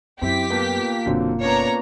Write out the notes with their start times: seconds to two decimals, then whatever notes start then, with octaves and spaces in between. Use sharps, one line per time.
0.21 F#2 C4 E4 G4 B6
0.50 A#2 A#3 B3 A5
1.06 F#1 B2 D3 F#3 C4
1.41 B3 C#4 D4 C#5 A#5